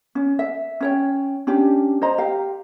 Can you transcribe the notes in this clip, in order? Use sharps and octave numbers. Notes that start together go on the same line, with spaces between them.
C#4
E5
C#4 C#5 G5
C#4 D4 G4
C5 D#5 A#5
G4 F5